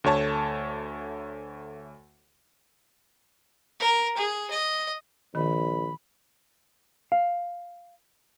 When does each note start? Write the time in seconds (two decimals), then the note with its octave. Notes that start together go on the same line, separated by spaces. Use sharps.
0.04 D2 A3 C#5 A5
3.80 A#4
4.17 G#4
4.50 D#5
5.35 A#1 D#3 B5
7.12 F5